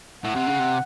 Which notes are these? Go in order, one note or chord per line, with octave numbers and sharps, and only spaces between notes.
A2 F#5
C3
C#3
C3